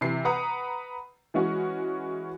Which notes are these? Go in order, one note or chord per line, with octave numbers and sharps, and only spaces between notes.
C3 E3 C7
B4 F#5 A#5 D#6
E3 G#3 C#4 F#4